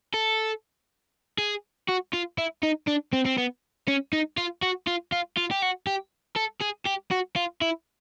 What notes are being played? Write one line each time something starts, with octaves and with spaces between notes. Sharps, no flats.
A4
G#4
F#4
F4
E4
D#4
D4
C4
C4
B3
C#4
D#4
F4
F#4
F4
F4
F4
G4
F#4
G4
A4
G#4
G4
F#4
F4
E4